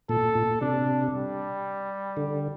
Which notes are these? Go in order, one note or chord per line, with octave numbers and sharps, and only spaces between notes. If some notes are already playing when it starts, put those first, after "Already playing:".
A#2 A4
A#2
C3 D4
G3
D3